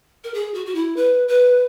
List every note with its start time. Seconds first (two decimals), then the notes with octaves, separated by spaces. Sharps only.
0.24 A#4
0.34 G#4
0.54 F#4
0.66 F#4
0.75 E4
0.96 B4
1.28 B4